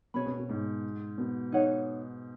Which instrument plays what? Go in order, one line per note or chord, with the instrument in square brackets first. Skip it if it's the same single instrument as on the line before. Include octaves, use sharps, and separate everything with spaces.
[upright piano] B2 [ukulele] G#4 C#5 B5
[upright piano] B2
B2
G#2
B2
[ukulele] D#4 G#4 C#5 F#5